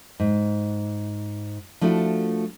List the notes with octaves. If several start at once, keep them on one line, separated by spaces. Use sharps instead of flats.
G#2
F3 A3 D4 E4 F#4